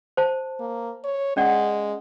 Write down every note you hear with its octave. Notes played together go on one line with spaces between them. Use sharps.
C5 A5
A#3
C#5
G#3 C#4 D5 F#5